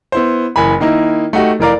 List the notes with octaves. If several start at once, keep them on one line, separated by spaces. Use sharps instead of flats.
B3 E4 C5
F#1 E3 G#5 B5
D#3 A#3 D#4 E4
A3 D#4 F#4 G4
F1 E3 A#4 D5 F5